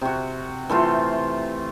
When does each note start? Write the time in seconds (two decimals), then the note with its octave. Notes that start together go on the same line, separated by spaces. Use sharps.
0.01 C3 F#4
0.70 E3 A3 F4 C5